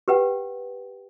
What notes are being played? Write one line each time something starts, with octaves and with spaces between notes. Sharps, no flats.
G4 B4 F#5 G5